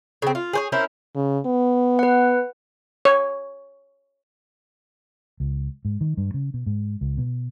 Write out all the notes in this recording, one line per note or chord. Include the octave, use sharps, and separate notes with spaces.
C#3 C4
F4
G#4 C5 C#5
C#4 E4 A#4 C5
C#3
B3
B4 F#5
C#5
C#2
G#2
D#3
G2
C#3
B2
G#2
C#2
B2